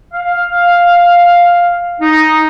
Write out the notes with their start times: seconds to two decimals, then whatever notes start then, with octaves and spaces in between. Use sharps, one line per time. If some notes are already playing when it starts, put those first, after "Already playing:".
0.13 F5
2.01 D#4